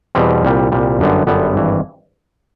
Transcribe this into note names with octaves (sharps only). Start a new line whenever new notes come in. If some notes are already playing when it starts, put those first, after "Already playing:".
E2 B2 G3 C4
C2 A#2 G3
C2 A#2 G3
G1 F#2 D3 G3 B3
G1 F#2 D3 G3 B3
G#1 G2 E3